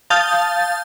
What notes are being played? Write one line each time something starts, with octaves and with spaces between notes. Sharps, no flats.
F5 A5 D#6 G6 A6